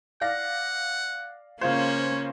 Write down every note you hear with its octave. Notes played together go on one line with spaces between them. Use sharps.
D5 F5 F#5 A#6
C#3 A#3 C#4 F4 C5 C#5